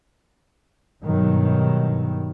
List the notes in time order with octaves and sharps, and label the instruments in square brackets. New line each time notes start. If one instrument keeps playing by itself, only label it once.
[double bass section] G2 B2 D#3 F#3